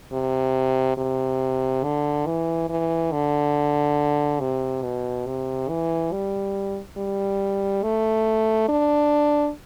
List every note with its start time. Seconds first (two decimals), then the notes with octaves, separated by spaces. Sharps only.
0.13 C3
0.97 C3
1.83 D3
2.26 E3
2.69 E3
3.12 D3
4.40 C3
4.83 B2
5.26 C3
5.69 E3
6.12 G3
6.97 G3
7.83 A3
8.69 D4